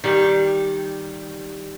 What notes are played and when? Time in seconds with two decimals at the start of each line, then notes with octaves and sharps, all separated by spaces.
0.04 D#3 G3 G4